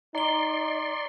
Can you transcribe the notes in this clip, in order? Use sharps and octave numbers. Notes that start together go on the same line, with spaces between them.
D#4 D5 A#5 C6 G7